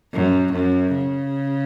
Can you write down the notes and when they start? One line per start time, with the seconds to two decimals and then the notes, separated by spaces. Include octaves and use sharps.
0.14 F#2
0.53 F#2
0.94 C#3